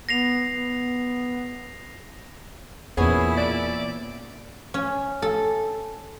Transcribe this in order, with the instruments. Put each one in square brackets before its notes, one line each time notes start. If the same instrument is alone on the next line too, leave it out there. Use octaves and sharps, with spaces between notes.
[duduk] B3 [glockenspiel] A#6 C7 F7
[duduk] B3
[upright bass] E2 [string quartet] A#2 E4 [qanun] B3 C#4 C#5 [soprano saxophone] G#4
[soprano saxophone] D5
[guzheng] C#4
A4